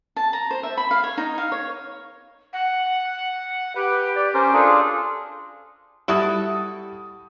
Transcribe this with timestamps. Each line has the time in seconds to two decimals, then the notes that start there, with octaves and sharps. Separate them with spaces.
0.17 A5
0.33 A#5
0.51 C5
0.63 E5
0.78 B5
0.91 F5
1.04 C#5
1.17 D#4
1.38 F5
1.52 C#5
2.53 F#5
3.75 G4 B4
4.16 D5
4.34 C#4 A#4 C5
4.53 D4 F4 G#4 A4
6.08 G3 E4 F#4 A4 D#6